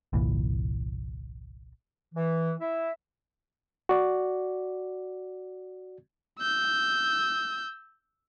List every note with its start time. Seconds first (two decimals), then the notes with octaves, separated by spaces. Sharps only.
0.13 G1 C2 A#2 E3
2.15 E3
2.60 E4 E5
3.89 F#4 D5
6.39 E6 G6